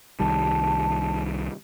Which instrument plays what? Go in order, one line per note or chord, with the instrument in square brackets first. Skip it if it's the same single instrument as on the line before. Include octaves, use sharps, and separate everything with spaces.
[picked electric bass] C2 D#3 G3 [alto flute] A5